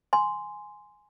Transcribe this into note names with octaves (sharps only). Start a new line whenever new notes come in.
G#5 C6